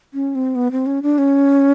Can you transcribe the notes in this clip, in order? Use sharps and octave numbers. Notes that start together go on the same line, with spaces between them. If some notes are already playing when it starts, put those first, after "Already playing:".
C#4
C4
B3
C4
C#4
D4
C#4